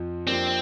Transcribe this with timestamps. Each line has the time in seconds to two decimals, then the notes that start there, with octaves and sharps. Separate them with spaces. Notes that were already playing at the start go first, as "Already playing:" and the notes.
Already playing: F2 F3
0.27 F2 F3 A#3 C4 D4 G4